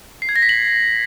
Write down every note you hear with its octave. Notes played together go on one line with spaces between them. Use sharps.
C7
G#6
A#6
B6
F#7